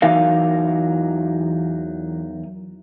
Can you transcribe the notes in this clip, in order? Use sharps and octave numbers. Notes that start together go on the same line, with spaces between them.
E2 E3 F#3 D#4 A#4 F5